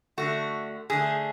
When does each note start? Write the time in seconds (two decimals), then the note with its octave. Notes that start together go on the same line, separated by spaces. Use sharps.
0.18 D3 A3 F#4
0.90 D3 A3 G#4